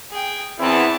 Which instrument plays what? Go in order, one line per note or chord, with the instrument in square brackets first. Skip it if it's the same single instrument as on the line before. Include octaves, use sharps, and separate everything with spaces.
[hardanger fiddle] G#4 G5
[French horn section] E2 [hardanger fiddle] C4 A5 [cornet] E4